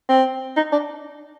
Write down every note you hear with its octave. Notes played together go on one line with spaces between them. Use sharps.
C4
D#4
D4